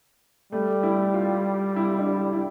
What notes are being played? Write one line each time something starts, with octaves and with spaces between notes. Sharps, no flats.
G3 A3
E4
F4
E4
D4
E4
E4